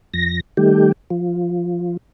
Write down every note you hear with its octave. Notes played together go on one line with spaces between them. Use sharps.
F2 A#6
D#3 G3 A3 G4
F3